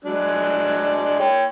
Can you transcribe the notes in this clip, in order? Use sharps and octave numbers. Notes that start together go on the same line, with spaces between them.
F#3 G#3 D4
C#5 G5